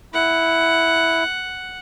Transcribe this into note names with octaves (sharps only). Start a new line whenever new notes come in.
E4 F#5